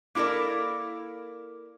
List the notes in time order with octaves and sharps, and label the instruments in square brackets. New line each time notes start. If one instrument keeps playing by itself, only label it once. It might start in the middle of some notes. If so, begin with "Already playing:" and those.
[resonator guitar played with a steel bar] A#3 E4 A4 A#4 D5